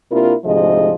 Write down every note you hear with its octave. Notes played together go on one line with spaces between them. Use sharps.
C3 A#3 D4 E4 F4 A#4
D2 G#2 C3 F3 G#4 D#5